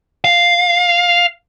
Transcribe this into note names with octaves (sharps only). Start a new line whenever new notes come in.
F5